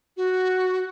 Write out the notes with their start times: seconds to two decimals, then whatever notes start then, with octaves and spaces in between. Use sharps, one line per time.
0.17 F#4